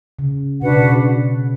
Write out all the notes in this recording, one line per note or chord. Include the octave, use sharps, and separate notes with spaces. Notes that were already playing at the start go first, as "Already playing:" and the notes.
C#3
B2 D4 F#4 B4 F#5
C#3
B2